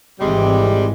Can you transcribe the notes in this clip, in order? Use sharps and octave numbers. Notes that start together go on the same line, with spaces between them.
G#1 C3 E3 G3 G#3